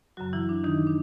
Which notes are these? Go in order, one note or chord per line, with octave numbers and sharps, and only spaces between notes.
F#2 C#3 F#3 F#4
E3 E4
D4
D#3 D#4
D4